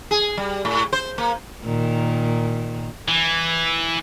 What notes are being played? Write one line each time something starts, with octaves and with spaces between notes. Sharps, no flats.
G#4
G3
A2
C5
A#3
A#2 D#3
E3